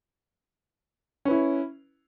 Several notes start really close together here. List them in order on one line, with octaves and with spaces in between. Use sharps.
C#4 B4 E4